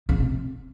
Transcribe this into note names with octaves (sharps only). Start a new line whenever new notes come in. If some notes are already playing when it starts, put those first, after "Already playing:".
C#3
C3